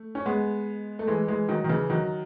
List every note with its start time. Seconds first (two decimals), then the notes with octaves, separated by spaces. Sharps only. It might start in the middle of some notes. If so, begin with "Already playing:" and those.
Already playing: A3
0.15 C#4
0.26 G#3 B3
0.99 A3
1.07 E3 G#3
1.28 E3 G#3
1.49 D#3 F#3
1.64 D#3
1.69 C#3 E3
1.90 D#3 F#3